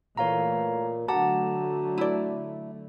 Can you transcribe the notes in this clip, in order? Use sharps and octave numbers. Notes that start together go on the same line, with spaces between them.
A#2 E3 A3 C#5 F5 A#5
D3 F#3 A3 F#4 F#5 A5 A#5 D6
E4 D5